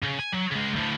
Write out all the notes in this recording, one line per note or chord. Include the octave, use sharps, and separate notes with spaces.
C#3
G#5
F#3
C#3 G#3
D2 A2